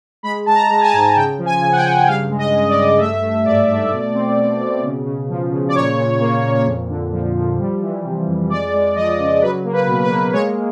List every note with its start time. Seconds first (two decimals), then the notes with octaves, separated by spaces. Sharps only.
0.23 G#3 B5
0.46 G#3 A5
0.55 A#5
0.70 G#3
0.81 G#5
0.84 A5
0.93 G#2
1.16 C#3 G5
1.38 F3
1.46 G#5
1.61 C#3
1.72 F#5
1.76 G5
1.84 C#3
2.07 G2 F5
2.30 G#3
2.38 D#5
2.53 G#3
2.69 D5
2.76 G2
2.98 A3 E5
3.22 A3
3.45 G#2 D5
3.68 A3
3.90 B2
4.13 C4
4.37 B2
4.60 B2
4.83 C#3
5.05 C#3
5.29 F3
5.51 C#3
5.68 D5
5.75 A#2 C#5
5.97 A#2
6.20 A#3
6.44 A#2
6.66 F2
6.89 D3
7.13 F3
7.35 F3
7.59 G3
7.81 E3
8.04 C3
8.27 F2
8.49 G#3 D5
8.73 G#3
8.95 F3 D#5
9.18 C#3
9.42 F#3 B4
9.65 A#3
9.73 B4
9.87 B2
10.02 B4
10.10 A#3
10.33 G#3 C#5